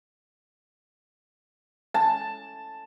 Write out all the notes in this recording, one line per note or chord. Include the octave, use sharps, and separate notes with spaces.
A5